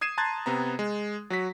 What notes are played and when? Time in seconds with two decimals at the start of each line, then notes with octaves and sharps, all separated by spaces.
0.01 D#6 G#6 C7 D#7 E7
0.18 A5 A#5 C6 F#6 G#6 A6
0.46 C3 B3 A#5
0.79 G#3
1.30 F#3 F#4 B6